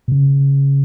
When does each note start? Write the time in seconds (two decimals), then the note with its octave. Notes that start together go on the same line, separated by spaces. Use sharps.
0.08 B2
0.12 C#3